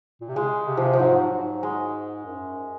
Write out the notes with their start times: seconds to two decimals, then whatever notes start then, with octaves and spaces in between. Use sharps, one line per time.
0.21 A#2
0.29 C3
0.35 C#3 G#3
0.67 C3
0.77 F3
0.93 F3
1.00 G#2 F#3
1.31 G#2
1.63 G#3
2.26 F#2